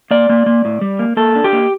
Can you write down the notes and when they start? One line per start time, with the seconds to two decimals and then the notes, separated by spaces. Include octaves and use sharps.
0.11 A#3 D5
0.29 A#3
0.46 A#3
0.65 A2
0.81 G3
0.99 A#3
1.17 A#3 A4
1.36 D4
1.44 G4
1.53 A#3